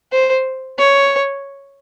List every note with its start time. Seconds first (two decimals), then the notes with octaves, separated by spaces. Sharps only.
0.12 C5
0.78 C#5